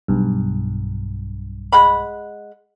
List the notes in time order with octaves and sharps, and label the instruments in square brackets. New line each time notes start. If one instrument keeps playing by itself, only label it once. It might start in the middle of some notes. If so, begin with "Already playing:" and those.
[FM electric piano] B1 G2
[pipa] G#3 F#5 B5